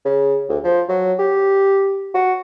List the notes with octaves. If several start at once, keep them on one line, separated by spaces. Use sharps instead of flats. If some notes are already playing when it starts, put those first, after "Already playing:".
C#3
D2
F3
F#3
G4
F#4